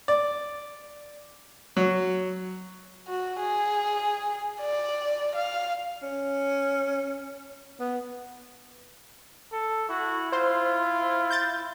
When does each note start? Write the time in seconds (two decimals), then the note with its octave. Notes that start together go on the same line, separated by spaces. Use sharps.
0.08 D5
1.76 F#3
3.08 F#4
3.40 G#4
4.61 D5
5.36 F5
6.02 C#4
7.80 B3
9.53 A4
9.89 E4 F#4
10.32 F4 C5
11.30 G6 A6